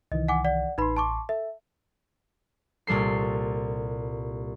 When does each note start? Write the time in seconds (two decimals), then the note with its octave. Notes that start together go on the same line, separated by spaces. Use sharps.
0.12 C2 D#3 E3 D#5
0.28 F#5 G#5 D6
0.45 D5 F#5
0.78 A1 D#4 B4 B5 C6
0.97 A5 C#6 D6
1.29 A4 E5
2.87 C2 A#2 G3 A4 C7